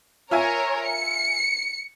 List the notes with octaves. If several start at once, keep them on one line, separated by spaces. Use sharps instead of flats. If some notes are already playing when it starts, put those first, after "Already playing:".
F4 A#4 C#5 E5 G#5
C#7